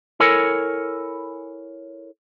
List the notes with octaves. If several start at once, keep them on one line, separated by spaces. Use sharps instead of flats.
E4 A4 A#4 C#5 G#5